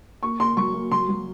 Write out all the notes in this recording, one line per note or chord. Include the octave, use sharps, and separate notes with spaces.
A#3 C#6
A#3 C6
F#3 C#6
A#3
F#3 C6
F#3